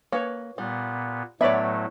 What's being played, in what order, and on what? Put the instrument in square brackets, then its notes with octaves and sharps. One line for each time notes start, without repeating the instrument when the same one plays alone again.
[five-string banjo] A#3 B4 [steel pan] C#5
[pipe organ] A#2 B3 [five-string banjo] G3
[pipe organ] A2 F#3 A3 [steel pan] B3 D5 B5 [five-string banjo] C#5 E5